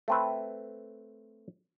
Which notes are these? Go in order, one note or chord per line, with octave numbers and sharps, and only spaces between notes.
A3 C4 B4